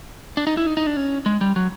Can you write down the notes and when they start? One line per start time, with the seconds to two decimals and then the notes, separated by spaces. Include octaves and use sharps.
0.37 D4
0.47 D#4
0.57 E4
0.67 D#4
0.77 D#4
0.87 D4
0.97 C#4
1.26 G#3
1.41 G3
1.56 F#3